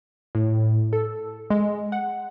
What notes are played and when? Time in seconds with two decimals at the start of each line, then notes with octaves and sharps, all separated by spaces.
0.35 A2
0.93 A4
1.50 G#3
1.92 F#5